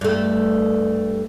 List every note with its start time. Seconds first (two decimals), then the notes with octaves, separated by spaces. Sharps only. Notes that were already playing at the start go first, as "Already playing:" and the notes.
0.01 G2 A3